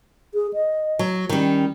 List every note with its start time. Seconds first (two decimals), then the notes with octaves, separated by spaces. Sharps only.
0.34 G#4
0.54 D#5
0.99 F#3
1.29 D#3 G3 C#4